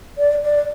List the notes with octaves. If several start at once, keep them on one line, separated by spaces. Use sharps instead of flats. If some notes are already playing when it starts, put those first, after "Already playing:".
D5
D5